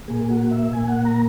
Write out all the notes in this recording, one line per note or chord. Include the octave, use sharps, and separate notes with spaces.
A#2 A#3 G#4
F#4
E5
A#2 A#3 G#5
F#5
A#5